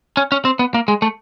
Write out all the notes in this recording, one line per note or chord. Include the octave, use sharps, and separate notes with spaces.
C#4
C#4
C4
B3
A#3
G#3
A3